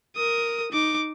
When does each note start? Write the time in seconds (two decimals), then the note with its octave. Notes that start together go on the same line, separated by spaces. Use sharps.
0.16 A#4 D#6
0.72 D#4 D6